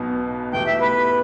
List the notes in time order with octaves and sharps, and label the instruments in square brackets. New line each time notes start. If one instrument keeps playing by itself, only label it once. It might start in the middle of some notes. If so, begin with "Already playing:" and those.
Already playing: [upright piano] B1 B2 B3
[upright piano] E2 B2 A3 G4 [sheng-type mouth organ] G5
[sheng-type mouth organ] E5
B4